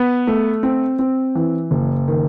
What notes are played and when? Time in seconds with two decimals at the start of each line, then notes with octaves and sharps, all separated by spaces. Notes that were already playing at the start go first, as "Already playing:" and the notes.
Already playing: B3
0.27 A3
0.63 C4
0.99 C4
1.35 E3
1.71 F#1
2.08 D#3